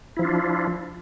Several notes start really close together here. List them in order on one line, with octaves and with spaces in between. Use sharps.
E4 F3 F4 D4